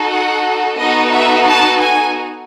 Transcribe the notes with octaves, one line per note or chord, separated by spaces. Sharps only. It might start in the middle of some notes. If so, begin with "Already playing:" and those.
Already playing: D#4 F#4 A4
F#5
B3 D#4 F#4 A4 D#5
E5
A5
G#5